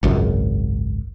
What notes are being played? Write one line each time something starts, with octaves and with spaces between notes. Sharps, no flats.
G#1 C#2 F#2